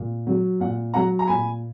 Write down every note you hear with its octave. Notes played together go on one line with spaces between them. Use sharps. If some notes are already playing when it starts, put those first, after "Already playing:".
Already playing: A#2
F#3
A#2 F#5
F#3 F#5 A#5
A#5
A#2 G#5 B5